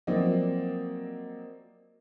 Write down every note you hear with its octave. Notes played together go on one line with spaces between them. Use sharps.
F3 F#3 A#3 C4 D5 D#5